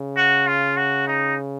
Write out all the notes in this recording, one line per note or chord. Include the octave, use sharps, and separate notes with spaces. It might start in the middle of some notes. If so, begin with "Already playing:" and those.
Already playing: C#3
F#4
F4
F#4
D#4